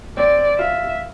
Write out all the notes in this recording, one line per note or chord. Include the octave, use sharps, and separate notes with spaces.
C4 D5
F4 E5